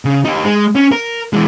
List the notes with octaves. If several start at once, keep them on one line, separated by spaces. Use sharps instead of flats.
C#3
D#4 G4
G#3
C#4
A#4
E3 G#3